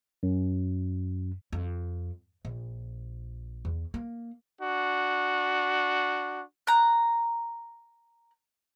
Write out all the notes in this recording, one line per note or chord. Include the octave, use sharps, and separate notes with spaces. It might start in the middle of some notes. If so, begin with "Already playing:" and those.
F#2
F2
A#1
E2
A#3
D4 F#4
A#5 F#6